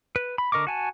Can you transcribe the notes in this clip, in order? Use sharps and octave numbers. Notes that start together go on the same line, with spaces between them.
B4
B5
D3 A#4 D#5 C#6 D6
F#4 G#5 A5